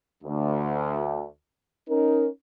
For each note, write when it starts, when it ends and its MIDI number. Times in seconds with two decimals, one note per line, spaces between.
0.23 1.25 38
1.89 2.27 61
1.89 2.27 63
1.89 2.27 70